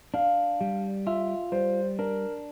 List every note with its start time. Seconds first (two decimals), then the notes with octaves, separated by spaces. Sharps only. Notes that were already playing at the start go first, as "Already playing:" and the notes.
0.14 D4 F5
0.61 G3
1.07 F4 E5
1.52 G3 C5
1.99 D4 A#4